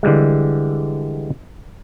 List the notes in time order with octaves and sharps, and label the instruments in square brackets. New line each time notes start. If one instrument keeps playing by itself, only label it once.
[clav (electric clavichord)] D3 E3 G3 G#3